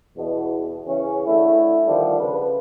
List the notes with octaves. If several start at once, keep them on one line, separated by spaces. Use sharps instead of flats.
E2 B2
C#3 E3 C#4
D3 A3 E4
D3 D#3 F3 G3
C#3 B4